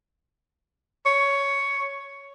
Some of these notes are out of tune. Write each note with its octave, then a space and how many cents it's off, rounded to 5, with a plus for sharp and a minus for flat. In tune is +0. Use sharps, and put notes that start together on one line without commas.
C#5 +10